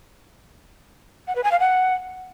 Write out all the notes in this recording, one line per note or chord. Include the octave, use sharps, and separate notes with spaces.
F#5
B4
G#5
F5
F#5